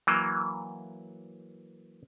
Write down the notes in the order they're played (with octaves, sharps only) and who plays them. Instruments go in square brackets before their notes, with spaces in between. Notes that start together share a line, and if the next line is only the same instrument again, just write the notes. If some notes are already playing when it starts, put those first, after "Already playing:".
[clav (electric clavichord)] E3 F#3 A#3